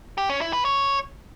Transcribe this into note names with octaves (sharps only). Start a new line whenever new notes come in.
G4
C#4
E4
B4
C#5